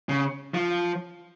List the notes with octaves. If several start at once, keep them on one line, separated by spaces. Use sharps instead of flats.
C#3
F3